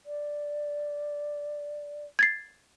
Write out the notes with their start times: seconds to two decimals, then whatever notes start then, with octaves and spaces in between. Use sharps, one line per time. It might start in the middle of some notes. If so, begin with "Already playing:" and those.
0.06 D5
2.19 G#6 A6 C7